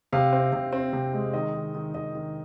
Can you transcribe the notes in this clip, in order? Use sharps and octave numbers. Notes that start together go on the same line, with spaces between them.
C3 F5
C4
C3
C4
C3
G#3
D#3 D#5
D#3
D#3
D#3 D#5
D#3